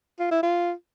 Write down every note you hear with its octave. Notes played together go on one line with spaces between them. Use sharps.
F4
E4
F4